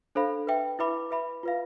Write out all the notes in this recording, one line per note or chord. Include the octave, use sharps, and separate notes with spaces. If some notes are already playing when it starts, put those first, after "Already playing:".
D4 A4 C5 F5 B5
B4 E5 G5
E4 B4 E5 B5 D6
B4 E5 B5
F4 B4 F5